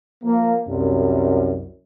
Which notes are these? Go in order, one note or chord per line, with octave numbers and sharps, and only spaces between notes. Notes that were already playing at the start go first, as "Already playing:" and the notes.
F3 A#3
C2 F#2